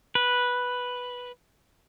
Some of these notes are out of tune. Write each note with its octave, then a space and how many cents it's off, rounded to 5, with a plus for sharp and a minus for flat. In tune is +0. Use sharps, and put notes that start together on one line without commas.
B4 -5